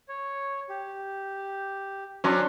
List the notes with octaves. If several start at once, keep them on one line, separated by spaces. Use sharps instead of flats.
C#5
G4
F#3 C#4 D4 C6 C#6